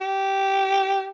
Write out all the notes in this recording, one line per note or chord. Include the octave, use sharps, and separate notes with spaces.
G4